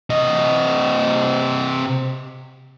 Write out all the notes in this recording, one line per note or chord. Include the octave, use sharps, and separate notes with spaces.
C3 D#5